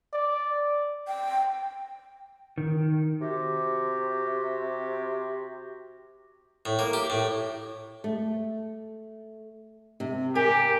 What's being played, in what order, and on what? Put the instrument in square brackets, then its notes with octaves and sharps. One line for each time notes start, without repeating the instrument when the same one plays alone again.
[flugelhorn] D5
[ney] G5
[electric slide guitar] D#3
[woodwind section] C3 F#4 G4
[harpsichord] A2
A#3
G4
A2
[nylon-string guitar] A3
C3
[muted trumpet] G4 [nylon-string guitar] A#4 G#5